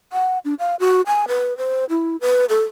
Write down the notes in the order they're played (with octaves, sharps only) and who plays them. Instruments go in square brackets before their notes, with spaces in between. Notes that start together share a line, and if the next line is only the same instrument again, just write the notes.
[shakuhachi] F#5
D4
F5
F#4
G#5
B4
C5
E4
B4
A4